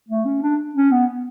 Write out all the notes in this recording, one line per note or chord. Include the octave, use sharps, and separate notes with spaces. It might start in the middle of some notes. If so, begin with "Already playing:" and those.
A3
C#4
D4
C#4
B3